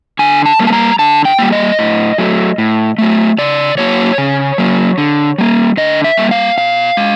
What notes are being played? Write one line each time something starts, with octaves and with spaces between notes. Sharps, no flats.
D3 G#5
A5
G3 A#3
A5
A#5
D3 A5
G5
G3 A#3
D#5
A2
F#3 A3
A2
F#3 A3
C#3 D5
F#3 A#3 C#5
C#3
F#3 A#3
D3
G3 A#3
D3 D#5
E5
G3 A#3
F5
B2 F5
G#3